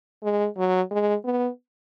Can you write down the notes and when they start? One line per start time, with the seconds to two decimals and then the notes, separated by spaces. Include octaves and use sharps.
0.24 G#3
0.57 F#3
0.91 G#3
1.25 B3